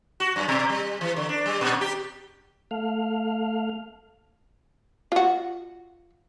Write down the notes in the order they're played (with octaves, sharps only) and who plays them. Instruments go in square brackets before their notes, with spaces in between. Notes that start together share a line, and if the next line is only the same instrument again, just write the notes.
[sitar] F#4
F#2
B2
G3
E3
D3
D4
G3
A#2
G4
[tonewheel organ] A3 F5
[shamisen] F4 F#4